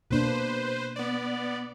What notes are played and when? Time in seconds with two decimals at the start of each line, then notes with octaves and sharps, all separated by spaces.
0.11 B2 A#3 D4 B4 C5
0.96 B3 D5